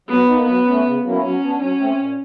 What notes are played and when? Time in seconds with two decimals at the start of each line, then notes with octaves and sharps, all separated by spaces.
0.09 F#3 B3
0.28 A#3 D#4
0.46 F#3 B3
0.65 A3 C#4
0.85 C#3
1.03 F#3 A#3 C#4 E4
1.22 F#3 C#4
1.41 B3 D4
1.59 F#3 C#4
1.78 A3 C4
1.98 A#2